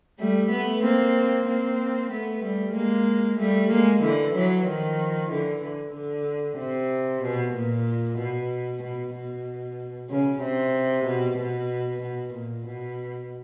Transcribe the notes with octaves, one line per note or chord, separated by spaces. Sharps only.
G3 A3
A3 B3
A#3 C4
A#3 C4
A3 B3
G3 A3
G#3 A#3
G3 A3
G#3 A#3
D3 E3
E3 F#3
D#3 F3
D3 E3
D3
D3
C3
B2
A#2
B2
B2
B2
C#3
C3
B2
B2
B2
A#2
B2